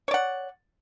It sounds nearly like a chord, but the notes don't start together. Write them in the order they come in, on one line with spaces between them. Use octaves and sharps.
C#5 D5 F#5